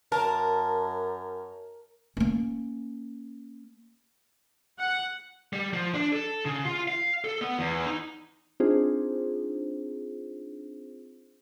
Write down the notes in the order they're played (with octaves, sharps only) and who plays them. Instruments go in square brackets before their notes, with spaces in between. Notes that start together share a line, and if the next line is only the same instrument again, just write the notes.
[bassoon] F#2 [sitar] A#4 [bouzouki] A5
[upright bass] A#3 C#4
[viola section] F#5
[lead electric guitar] G3
F3
D4
A4
C#3
F4
F5
A4
B3
E2
D#4
[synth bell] C4 D4 D#4 F4 G#4 C5